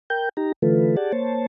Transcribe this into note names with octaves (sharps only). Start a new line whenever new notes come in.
A#4 G5 G6
D#4 G4 A#5
D3 E3 A3 F4 A4 B4
G4 G#4 D5 F#5 A5
A#3 C5 C#5 A5